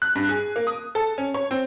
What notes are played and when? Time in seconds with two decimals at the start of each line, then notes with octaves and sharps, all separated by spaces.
0.02 F#6
0.15 G2
0.29 G#4
0.56 A#3
0.67 D#6
0.95 A4
1.18 C#4
1.34 C#5
1.51 C4